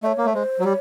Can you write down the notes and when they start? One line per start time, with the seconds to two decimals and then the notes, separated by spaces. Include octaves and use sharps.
0.03 A3 C#5 D#5
0.18 A#3
0.25 A3
0.34 G#3 C5
0.59 F#3
0.63 G3 C#5